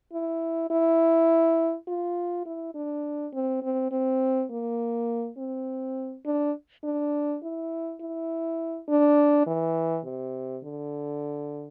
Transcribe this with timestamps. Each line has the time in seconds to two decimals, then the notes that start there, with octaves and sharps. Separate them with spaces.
0.13 E4
0.70 E4
1.88 F4
2.46 E4
2.75 D4
3.33 C4
3.62 C4
3.91 C4
4.51 A#3
5.37 C4
6.25 D4
6.84 D4
7.43 E4
8.01 E4
8.89 D4
9.47 E3
10.05 C3
10.64 D3